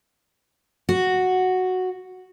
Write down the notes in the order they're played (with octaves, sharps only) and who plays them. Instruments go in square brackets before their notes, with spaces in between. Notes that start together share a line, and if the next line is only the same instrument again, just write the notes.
[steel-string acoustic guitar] F#4